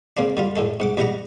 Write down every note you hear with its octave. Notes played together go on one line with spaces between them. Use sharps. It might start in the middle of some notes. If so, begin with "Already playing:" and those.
C#3 A#3 C4 D4
D3 G3 F4
A2 D3 G#3 A4
G#2 F#5 D6
E2 G3 G4 D#5 F#5 A#5